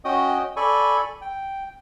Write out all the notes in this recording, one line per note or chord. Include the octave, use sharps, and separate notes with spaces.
C#4 F#4 D#5 G5 D#6
A4 D5 G#5 B5 C#6
G5